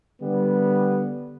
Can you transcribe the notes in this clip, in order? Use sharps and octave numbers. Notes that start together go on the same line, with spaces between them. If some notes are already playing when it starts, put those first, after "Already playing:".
D3 G3 B3